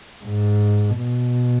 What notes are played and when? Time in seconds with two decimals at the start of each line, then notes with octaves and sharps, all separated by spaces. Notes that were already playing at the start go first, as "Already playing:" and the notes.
0.25 G#2
0.98 B2